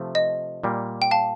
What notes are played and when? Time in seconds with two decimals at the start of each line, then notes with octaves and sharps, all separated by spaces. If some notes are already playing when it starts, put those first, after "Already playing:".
Already playing: C3 F3 A3
0.15 D#5
0.63 A#2 G3 A#3
1.02 G5
1.11 F5 A5